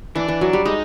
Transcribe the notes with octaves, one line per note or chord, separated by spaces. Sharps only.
E3 D4
E3
F#3
G3
G#3 D#4